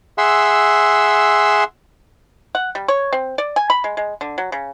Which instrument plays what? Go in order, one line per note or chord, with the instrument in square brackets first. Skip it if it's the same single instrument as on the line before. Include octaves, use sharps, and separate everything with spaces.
[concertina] G#4 E5 F#5 C6 E6
[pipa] F#5
G3
C#5
C4
D5
G#5
B5
G#3
G#3
D3
F#3
C#3